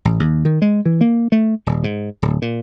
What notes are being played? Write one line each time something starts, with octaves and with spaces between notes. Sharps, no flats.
A1
D#2
D#3
G#3
E3
A#3
A3
D#1
G#2
D1
A#2